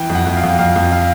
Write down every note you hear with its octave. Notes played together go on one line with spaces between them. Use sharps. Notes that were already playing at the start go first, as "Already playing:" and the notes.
Already playing: E3 G5
F2
F#5
F2
F5
F2
F2 F5
F2
F5